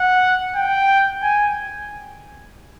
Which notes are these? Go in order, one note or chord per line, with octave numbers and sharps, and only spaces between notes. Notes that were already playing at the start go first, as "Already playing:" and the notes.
Already playing: F#5
G5
G#5